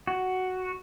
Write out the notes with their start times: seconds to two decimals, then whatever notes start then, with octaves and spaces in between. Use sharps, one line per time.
0.07 F#4